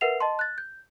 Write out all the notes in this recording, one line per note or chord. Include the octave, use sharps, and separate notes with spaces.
A#4 B4 E5 F#5 C7 F7
D#5 A5 C6
F#6 A6
G6